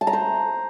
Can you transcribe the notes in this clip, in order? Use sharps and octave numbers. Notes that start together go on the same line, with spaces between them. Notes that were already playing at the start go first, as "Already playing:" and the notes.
A5
A#5
C5